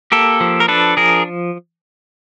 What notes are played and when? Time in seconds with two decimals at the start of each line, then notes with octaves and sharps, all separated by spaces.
0.12 A#3 G4 A4
0.40 F3
0.60 A#4
0.68 D4 A4 B4
0.97 F3 G#4 A#4